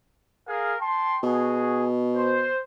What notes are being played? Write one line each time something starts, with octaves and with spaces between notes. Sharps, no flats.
G#4 A#4 F5
G5 A5 C6
B2 F#4 G#4
C5